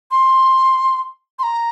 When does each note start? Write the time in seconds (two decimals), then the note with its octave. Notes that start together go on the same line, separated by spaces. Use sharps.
0.11 C6
1.39 C6
1.43 A#5